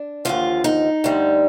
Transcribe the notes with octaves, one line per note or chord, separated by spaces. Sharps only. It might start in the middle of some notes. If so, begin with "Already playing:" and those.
Already playing: D4
D#2 D3 F3 F4
D#4
D2 D3 G3